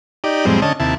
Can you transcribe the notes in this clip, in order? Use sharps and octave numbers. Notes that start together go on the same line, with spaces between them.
D#4 G4 D5
F2 A2 G3 G#3 C4
D3 C#4 D#5 A5
D#2 C3 E4 A5